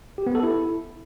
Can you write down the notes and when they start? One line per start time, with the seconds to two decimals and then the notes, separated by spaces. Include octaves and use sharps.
0.18 G4
0.26 B3
0.35 A4
0.43 E4